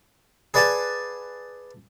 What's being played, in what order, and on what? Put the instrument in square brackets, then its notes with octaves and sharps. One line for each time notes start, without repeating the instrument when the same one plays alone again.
[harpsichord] G#4 B4 D5 F#5 G#5 A5